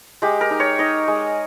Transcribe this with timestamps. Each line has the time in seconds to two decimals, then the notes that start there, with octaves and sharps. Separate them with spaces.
0.22 G#3 G4
0.41 A#4
0.51 D#4
0.60 C#5
0.79 D#4 D#5
1.08 G#3